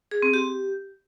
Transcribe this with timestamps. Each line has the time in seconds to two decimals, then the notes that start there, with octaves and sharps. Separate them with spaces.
0.11 G#4
0.22 C4
0.34 G4